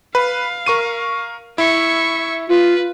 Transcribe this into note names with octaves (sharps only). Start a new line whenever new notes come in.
B4 F5
A#4 C#6 D#7
E4 E5 C#6
F4 B4